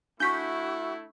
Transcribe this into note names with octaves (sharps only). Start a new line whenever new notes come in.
A3 D4 E4 F#4 C#6 G6 B6